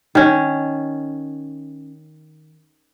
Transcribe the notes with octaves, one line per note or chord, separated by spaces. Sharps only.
D#3 C#4